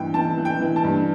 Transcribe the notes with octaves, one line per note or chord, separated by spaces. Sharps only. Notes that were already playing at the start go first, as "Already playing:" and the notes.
Already playing: G2 E3 G5
E3 A5
E3
G5
E3
A5
G2